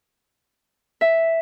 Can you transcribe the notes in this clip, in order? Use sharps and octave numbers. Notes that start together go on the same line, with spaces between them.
E5